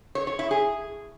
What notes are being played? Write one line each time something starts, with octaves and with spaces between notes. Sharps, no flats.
C#5
C#5
E4
G#4